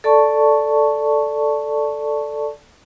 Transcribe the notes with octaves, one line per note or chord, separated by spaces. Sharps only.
A4 D5 A5 C#6